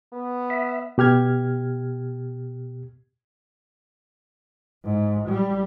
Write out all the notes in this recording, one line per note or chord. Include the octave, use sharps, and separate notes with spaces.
B3
E5
B2 G4 F6 G#6
G#2
G3